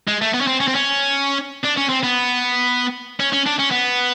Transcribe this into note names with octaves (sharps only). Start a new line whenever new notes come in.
G#3
A3
B3
C#4
C4
C#4
C4
C#4
D4
C#4
C4
B3
C#4
C#4
D4
C#4
B3